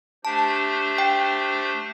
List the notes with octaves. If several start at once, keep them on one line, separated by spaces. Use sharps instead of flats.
A3 D4 G4 C5 A5
G5